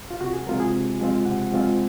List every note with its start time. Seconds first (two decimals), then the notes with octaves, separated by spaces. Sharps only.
0.11 F4
0.21 C3 F#4
0.33 G#4
0.46 F3 G#3 C4 F4 A#4
0.60 G#4
0.73 C3
1.00 F3 G#3 C4 F4
1.25 C3 F#5
1.52 F3 G#3 C4 F4